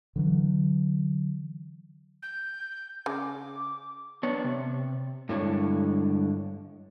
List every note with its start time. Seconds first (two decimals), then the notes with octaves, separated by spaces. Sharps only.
0.16 D3 E3 F#3
2.22 G6
3.06 C#3 D6
4.23 B3 D4 C#5
4.44 C3
5.29 G2 D3 G#3 E4 C#5 D5